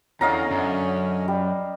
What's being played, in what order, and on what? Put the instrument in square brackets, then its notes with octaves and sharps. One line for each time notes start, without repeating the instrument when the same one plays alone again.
[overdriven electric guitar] E2 [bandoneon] D3 C#4 [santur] D#5 F5 A#5
[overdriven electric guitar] F#2
[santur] G3